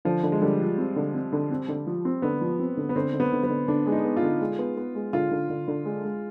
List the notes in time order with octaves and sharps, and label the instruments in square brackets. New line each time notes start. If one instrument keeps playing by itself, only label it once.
[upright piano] D3 [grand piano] F3
[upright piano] D3
[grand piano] G#3
[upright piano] D3 [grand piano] G3
[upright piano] F3
C4
D3
C4
D3
C4
D3
F3
C4
[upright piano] D3 [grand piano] B3
[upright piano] F3
C4
D3
[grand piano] B3
[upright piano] D3 [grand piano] C4
[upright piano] D3
[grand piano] B3
[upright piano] D3
[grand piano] B3
[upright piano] D3
[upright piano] D3 [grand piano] D4
[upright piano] G#3
[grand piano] D#4
[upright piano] B3
[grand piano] F4
[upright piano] D3
G#3
B3
B3
G#3
[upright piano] D3 [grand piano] F4
[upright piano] D3
D3
D3
G#3
G#3